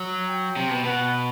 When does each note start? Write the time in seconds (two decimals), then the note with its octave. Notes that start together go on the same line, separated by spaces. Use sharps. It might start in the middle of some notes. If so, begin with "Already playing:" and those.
Already playing: F#3
0.28 G5
0.56 C3
0.70 B2
0.84 B2 F#5